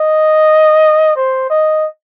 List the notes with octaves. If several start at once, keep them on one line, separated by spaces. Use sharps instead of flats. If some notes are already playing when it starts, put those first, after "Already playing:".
Already playing: D#5
C5
D#5